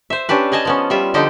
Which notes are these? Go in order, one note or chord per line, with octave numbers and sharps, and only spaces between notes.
C5 E5
C#4 D4 G4 B4
G#4 D#5 G#5 A5
F3 B3 C#4
G3 F4 E5
D3 F3 D#4 G4 D#5